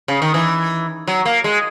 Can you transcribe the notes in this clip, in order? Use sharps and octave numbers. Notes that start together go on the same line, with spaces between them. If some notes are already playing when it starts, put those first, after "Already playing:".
C#3
D#3
E3
F#3
A#3
G#3